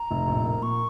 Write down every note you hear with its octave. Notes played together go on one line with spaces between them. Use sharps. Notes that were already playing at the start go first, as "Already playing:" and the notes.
Already playing: A#5
F1
A#1
A#3
A#2 C#6